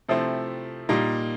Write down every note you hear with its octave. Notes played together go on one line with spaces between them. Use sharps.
C3 F3 A3 C4 E4
A#2 G3 A#3 D#4